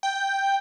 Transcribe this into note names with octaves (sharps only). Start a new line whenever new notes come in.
G5